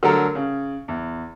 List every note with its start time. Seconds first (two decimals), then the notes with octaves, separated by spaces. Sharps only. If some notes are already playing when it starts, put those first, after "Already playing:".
0.03 D3 F#3 A3 A4 A#4
0.35 C#3
0.88 E2